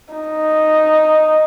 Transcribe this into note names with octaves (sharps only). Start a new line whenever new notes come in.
D#4